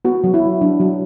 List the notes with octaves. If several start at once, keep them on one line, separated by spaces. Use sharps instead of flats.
B3 F#4
F#3
E4
B3
F#3 D4
F#3